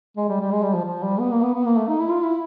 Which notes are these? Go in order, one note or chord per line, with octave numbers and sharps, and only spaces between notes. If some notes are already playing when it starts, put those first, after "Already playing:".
G#3
G3
G3
G#3
G3
F3
F3
G3
B3
A#3
B3
B3
A#3
A3
D#4
E4
F4
E4